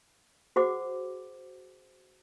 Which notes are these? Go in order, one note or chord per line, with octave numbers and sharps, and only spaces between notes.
F#4 G#4 C5 F#5 D6